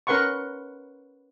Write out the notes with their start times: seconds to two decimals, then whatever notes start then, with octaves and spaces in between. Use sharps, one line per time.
0.07 C#4 A#4 B4 F#5 C6 C#6